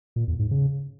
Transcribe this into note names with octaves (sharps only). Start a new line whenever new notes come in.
A#2
E2
G#2
C#3